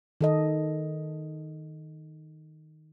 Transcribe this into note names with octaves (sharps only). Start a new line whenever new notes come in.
D#3 A4 D#5